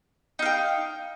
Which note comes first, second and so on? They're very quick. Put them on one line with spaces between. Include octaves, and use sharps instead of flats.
D#4 F5 G5